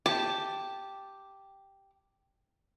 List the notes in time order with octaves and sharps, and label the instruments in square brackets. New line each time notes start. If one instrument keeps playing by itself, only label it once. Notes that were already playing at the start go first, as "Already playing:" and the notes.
[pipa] G4 [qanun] A5